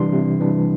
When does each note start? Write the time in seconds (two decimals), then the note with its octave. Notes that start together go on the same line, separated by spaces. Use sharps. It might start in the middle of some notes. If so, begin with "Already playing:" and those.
Already playing: C3 E3 G3 D4 C6
0.13 C3
0.40 E3 G3 D4